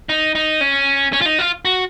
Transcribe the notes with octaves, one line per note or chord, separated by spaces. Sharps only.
D#4
D#4
C#4
C#4
F4
D#4
F4
F#4